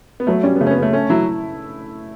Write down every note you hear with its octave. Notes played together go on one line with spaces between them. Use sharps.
B3
F#3 A3
G3 C#4
B3
C#3 A3
C#4
B3
C#3
A3
A3 C#4
F#3 E4